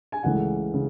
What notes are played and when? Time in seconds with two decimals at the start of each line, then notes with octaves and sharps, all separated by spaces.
0.12 G#5
0.23 C#2 C#3 E3 A3 F#5
0.74 C#3